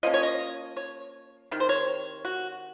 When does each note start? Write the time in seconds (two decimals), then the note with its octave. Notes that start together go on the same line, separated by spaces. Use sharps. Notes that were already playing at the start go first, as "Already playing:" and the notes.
0.03 F3 A#3 C#4 D#5
0.14 C#5
0.23 D#5
0.77 C#5
1.51 C3 D#3
1.60 C5
1.69 C#5
2.25 F#4